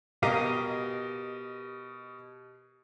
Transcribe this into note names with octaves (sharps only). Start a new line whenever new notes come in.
B2 G4 A#4 D#5 F5 D#7